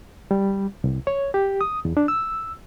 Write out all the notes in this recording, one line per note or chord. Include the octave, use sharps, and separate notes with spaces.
G3
C2
C#5
G4
D#6
E2
D4
E6